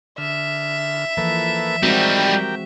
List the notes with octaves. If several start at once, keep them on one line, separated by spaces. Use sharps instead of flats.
D3 E5 F6
E3 F3 A#3 A4 B4
G3 G#3 C4 D#4 F#4 G4 A#4 G5